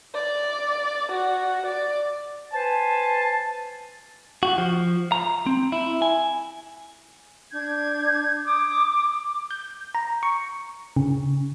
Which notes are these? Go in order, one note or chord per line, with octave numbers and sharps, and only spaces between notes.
D5
F#4
D5
B4 C5 G#5 A5
F#4
F3
A#5
C4
E4
G#5
D4 G6 G#6
D6 D#6
G6
A#5
C#6
C#3